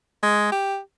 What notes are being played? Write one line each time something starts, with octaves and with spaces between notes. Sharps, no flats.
G#3
G4